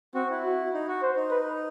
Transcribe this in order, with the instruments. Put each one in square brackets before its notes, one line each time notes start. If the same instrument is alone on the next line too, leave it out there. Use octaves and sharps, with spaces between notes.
[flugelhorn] C4 [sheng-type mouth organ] F#4
[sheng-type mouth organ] E4
[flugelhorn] F#4
[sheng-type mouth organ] D#4
F#4
[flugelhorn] C5
[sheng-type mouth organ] D#4
[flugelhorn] B4